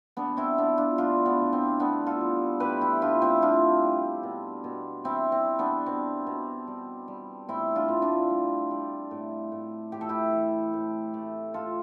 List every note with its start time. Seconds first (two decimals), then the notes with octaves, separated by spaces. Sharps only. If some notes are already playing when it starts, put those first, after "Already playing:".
0.16 G3 B3 D4
0.37 C4 E4
0.58 G3 B3 D4
0.78 D4 F4
0.98 A2 D4 F4
1.26 B3 D4
1.39 A2
1.53 C4
1.80 G3 B3 D4
2.06 F4 A4
2.21 G3
2.60 A2 G4 B4
2.81 E4 G4
3.01 A2 D4 F4
3.22 C4 E4
3.42 G3 D4 F4
3.83 G3
4.23 B2
4.64 B2
5.04 G3 C4 E4
5.32 C4
5.45 G3
5.59 B3 D4
5.86 B2 C4
6.27 B2
6.67 G3
7.08 G3
7.48 A2 C4 E4
7.75 D4 F4
7.89 A2
8.02 D4 F4
8.30 G3
8.71 G3
9.11 A2
9.52 A2
9.92 A2 G4
10.01 A4
10.09 E4 G4
10.32 E3
10.73 A2
11.14 A3
11.54 A2 F4 A4